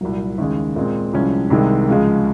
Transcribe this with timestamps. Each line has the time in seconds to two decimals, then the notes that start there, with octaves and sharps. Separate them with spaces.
0.01 C2 A#2 F#3
0.38 D#2 C#3 G#3
0.76 A#2 G#3 C4
1.13 C2 C3 F3 G#3 C#4
1.50 C2 C3 D#3 G#3
1.88 C#2 C#3 F3 G#3